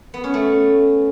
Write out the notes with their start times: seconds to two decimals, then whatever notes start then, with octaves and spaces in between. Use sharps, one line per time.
0.14 B3
0.24 C#4
0.34 A3